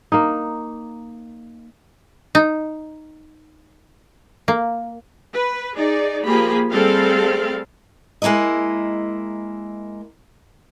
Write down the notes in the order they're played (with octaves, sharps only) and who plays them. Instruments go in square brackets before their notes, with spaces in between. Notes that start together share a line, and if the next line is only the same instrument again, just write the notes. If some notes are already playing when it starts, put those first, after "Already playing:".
[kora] A#3 D#4
[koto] D#4
A#3
[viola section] B4
D#4 G#4 D5
F3 A#3 G4 G#4 B5
G3 A3 C4 G#4 A4 F5
[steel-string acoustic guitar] G#3 A#3 E4 A#4 D#5